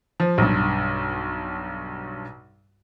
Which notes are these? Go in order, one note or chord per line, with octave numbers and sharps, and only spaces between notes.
F3
B1 G2